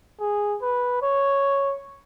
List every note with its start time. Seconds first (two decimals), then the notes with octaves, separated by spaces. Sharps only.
0.20 G#4
0.62 B4
1.02 C#5